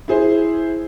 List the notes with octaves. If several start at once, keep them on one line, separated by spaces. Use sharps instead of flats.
E4 G#4 C5